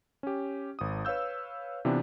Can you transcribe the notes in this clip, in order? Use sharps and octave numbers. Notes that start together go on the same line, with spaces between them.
C#4 G4
G#1 D#6
B4 C#5 F5 E6 G6
C3 E3 B3 D4 F4 G4